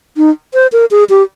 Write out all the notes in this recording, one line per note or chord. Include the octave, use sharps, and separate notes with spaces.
D#4
C5
A#4
G#4
G4